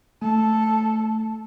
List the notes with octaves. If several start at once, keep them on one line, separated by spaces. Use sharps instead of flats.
A3 A4